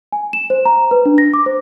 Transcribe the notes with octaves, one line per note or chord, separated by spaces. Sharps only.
G#5
E7
C5
A#5
B4
D4
A#6
D6
C5